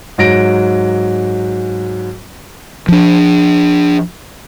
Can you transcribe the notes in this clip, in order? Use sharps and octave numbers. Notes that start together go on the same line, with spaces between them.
G#2 F#3 A#6 D7
F3 D4